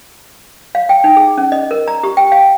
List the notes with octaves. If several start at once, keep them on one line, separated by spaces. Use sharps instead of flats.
F5
G5
D#4
G#4
C#4
D#5
A#4
A#5
G4
G5
F5